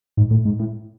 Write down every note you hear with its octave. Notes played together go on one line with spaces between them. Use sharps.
G#2
A2
G#2
A2